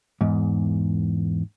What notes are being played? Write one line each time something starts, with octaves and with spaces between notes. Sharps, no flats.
E2 G#2